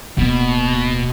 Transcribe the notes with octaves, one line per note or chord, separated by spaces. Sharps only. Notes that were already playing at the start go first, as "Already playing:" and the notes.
D1 B2 A#3